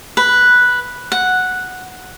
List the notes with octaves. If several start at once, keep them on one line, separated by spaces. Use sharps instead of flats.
B4
F#5